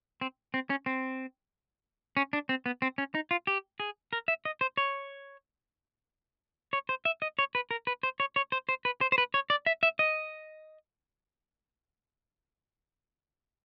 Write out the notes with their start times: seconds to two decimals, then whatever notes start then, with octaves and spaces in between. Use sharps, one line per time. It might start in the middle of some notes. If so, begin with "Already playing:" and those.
0.21 C4
0.54 C4
0.70 C#4
0.86 C4
2.17 C#4
2.33 D4
2.49 C4
2.66 B3
2.82 C4
2.98 C#4
3.15 D#4
3.31 F4
3.47 G4
3.80 G#4
4.13 A#4
4.28 E5
4.45 D#5
4.61 C5
4.77 C#5
6.73 C#5
6.89 C5
7.05 E5
7.22 D#5
7.39 C#5
7.55 B4
7.71 A#4
7.87 B4
8.03 C5
8.20 C#5
8.36 C#5
8.52 C5
8.69 C5
8.85 B4
9.01 C5
9.12 C5
9.18 B4
9.34 C#5
9.50 D5
9.66 E5
9.83 E5
9.99 D#5